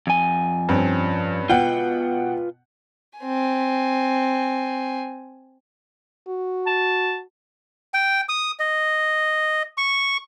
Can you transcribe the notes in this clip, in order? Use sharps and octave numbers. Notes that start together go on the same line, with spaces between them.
F2 G#5
G2 C4 C#4
B2 F4 B4 F#5 G5
C4 G#5
F#4
A5
G5
D#6
D#5
C#6